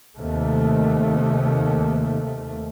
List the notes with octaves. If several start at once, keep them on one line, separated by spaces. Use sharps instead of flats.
D#2 C3 A3